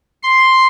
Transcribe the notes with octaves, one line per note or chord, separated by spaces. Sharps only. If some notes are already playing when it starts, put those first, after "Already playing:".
C6